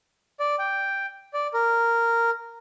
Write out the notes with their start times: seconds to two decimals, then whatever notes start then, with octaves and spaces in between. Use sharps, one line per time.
0.40 D5
0.59 G5
1.34 D5
1.54 A#4